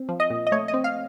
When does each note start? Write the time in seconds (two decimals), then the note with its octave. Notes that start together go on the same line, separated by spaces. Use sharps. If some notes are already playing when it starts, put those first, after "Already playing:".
Already playing: C4
0.09 F3
0.20 D#5
0.30 A#2
0.47 D#5
0.52 A3 C#5
0.68 D#5
0.74 C4
0.84 F5